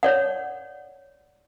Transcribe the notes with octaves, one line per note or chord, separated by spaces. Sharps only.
C#5 D5 F#5